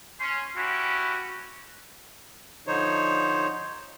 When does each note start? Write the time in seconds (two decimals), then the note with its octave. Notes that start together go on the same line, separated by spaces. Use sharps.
0.20 C#4 C6
0.56 C#4 E4 F#4 G4
2.67 D3 F3 D#4 C5 C#5